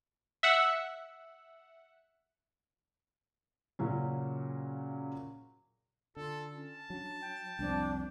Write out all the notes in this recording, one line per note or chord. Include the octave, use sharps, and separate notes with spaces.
E5 F#5 E6
A#2 C#3 F#3 C#4
D3 F4 A4
C#4 A5
F#3 D4
G5
C2 F2 C4 D4